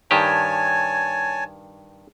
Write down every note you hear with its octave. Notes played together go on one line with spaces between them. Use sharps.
G2 D#3 G4 C#5 G#5 A5